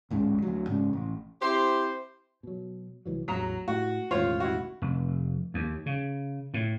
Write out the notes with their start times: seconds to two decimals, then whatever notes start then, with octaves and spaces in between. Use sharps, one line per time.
0.10 D1 C#2 G#2 C#3
0.42 D2 F#3
0.67 G#2 C#3
0.93 A1
1.42 C4 E4 G4 C5
2.43 B2 F#3
3.06 C2 E3 F#3
3.28 A1 E2 F#3 A#5
3.68 A2 F#4
4.11 E1 A1 D#3 F4 C5 C#5
4.40 E4 F#4
4.82 F1
5.54 D#2
5.86 C#3
6.54 A2